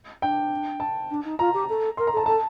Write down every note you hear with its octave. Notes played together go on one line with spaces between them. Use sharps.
D4 G5
A5
D4
D#4
F4 A#5
G4
A4
A#4 C6
A#5
A4 A5
A4 A5